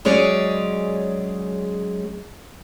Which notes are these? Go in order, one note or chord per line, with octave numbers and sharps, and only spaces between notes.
F#3 G#3 C#4 G#4 C#5 D5